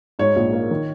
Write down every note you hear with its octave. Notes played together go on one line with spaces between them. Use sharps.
G#2 C#5
A#1
A#3
D#3